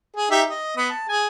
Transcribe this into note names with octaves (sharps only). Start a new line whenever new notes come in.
G#4
D#4 G4 E5
D#5
B3 D#6
A5
G#4 G#5